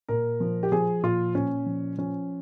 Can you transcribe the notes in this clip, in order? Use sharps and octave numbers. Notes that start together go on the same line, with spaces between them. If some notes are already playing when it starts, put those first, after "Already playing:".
A#2 A#4
F3
G4
F3 G#4
A#2 F4
A#2 C#4
F3
F3 C#4